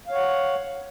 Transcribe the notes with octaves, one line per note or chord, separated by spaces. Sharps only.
C#5 F5 F#5